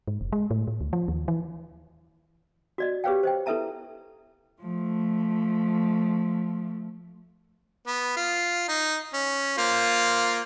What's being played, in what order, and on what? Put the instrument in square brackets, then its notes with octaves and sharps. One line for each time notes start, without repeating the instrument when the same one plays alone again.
[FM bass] G#2
F1
G#3
A2
A2
D2
F3
D#2
E3
[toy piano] F#4 D5 D#5
G4 G#4 B4 C#5 F5 G5
C5 D#5 G5
E4 A4 B4 E5 A5 A#5
[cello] F3 A3
[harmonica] B3
F4
D#4
C#4
A#3 F4 C5